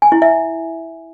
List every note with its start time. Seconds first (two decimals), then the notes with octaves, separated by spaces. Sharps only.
0.02 G#5
0.12 E4
0.22 E5